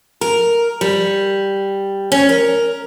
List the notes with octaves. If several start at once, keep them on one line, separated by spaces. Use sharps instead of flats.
A#4
G3
C#4
A#4